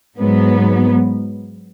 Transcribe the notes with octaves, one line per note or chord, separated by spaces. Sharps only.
G#2 F#3 B3